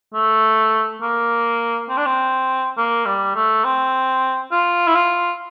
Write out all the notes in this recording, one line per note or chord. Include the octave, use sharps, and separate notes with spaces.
A3
A#3
C4
D4
C4
A#3
G3
A3
C4
F4
E4
F4